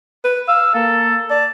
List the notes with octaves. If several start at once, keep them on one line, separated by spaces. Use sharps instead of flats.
B4
F5 E6
A#3 A4
D5 A5